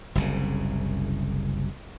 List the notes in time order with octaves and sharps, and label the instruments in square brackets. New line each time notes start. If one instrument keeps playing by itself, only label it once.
[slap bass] F#1 C2 C#3